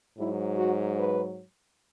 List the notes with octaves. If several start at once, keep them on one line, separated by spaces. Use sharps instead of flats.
G#2 F#3 E4
F#4
B4